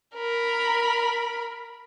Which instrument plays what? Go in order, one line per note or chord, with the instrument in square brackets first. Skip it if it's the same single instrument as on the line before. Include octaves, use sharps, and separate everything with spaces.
[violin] A#4 B5